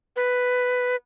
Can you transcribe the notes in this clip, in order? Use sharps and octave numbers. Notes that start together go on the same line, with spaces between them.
B4